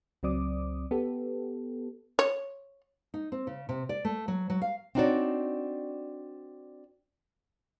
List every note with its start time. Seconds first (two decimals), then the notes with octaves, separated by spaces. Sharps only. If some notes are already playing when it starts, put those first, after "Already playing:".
0.23 C#2 F#3 C4 D5 D6 D#6
0.91 B3 G4 A4
2.19 C#5
3.14 D#4
3.32 C4
3.47 C#3
3.69 C3
3.89 D5
4.05 A3
4.28 F#3
4.50 F#3
4.62 F5
4.95 C4 D4 D#4 F#4 C#5 D5